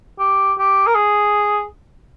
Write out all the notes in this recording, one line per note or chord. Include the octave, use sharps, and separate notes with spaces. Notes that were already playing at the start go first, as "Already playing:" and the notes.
G4
G4
A#4
G#4